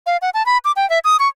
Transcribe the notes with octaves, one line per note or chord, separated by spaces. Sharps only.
F5
F#5
A5
B5
D6
G5
E5
D#6
C#6